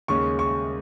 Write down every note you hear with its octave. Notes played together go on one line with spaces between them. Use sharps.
D#2 C#3 G#3 C#4 C#6
C#6